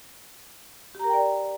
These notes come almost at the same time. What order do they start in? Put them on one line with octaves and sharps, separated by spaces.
G4 A#5 A#4 G5 D5